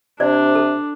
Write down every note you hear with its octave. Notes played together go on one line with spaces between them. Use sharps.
C3 D4 C5 D5
A4